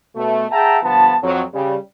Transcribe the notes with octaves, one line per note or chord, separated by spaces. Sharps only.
B2 A3
G#4 E5 F#5 G5 A5 A#5
G1 F3 B3 A5
F2 F#3
C#3 G3